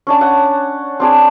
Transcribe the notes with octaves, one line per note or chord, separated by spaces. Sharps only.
C#4 D4 A5
F#5
C4 D4 G#4